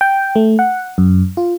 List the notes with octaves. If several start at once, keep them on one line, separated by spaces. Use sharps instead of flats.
G5
A3
F#5
F#2
F4